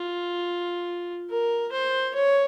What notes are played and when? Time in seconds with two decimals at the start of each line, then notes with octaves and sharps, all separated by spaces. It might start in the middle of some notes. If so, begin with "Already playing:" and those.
Already playing: F4
1.30 A#4
1.72 C5
2.14 C#5